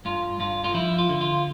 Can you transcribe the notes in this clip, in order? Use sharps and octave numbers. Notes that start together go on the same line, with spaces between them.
G2 F4
G2 F4
F4
F3 E4
F4
D3
F4